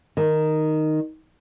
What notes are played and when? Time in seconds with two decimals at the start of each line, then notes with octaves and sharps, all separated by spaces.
0.17 D#3